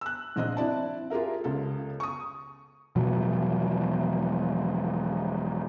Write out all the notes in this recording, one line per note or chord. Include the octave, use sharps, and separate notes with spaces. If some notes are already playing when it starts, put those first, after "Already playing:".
E6 F#6
A#1 C4 D#5 F#6
C4 E4 D5 A5
F4 G4 G#4 A#4 E5
C#2 C#3 A4
C#6 D#6
E1 B2 F3 F#3